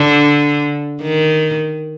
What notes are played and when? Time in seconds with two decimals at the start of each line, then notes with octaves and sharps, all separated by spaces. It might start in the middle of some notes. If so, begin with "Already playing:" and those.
Already playing: D3
1.02 D#3